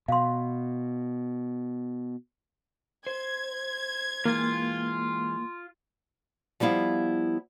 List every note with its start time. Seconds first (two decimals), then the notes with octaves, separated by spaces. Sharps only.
0.08 B2 F5 C6
3.07 C5 G#6
4.26 E3 G#3 A#3 F4
6.60 F3 G3 B3 E4 F5